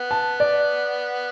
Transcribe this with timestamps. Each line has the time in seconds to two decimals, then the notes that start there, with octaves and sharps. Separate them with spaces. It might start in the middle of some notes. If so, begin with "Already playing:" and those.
Already playing: B3
0.11 A5
0.40 D5